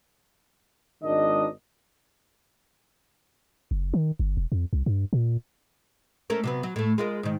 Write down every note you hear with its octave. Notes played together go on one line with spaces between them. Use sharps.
G#1 D#3 G#3 D4 D#5
F#1
D#3
G1
E1
F2
C2
G2
A#2
A3 C#4 A#4
C3 F#3 B3
F#3
A2 A3
G#3 F4 A#4
G#2 D#3